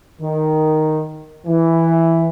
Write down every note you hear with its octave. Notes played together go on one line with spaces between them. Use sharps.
D#3
E3